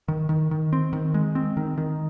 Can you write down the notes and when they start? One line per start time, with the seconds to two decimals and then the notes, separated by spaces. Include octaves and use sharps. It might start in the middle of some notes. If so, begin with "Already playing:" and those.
0.08 D#3
0.29 D#3
0.51 D#3
0.73 C4
0.93 D#3
1.14 G#3
1.35 C4
1.57 D#3
1.78 D#3